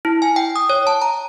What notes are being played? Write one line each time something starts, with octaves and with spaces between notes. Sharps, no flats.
E4
G#5
G5
D#6
C#5
A5
A#5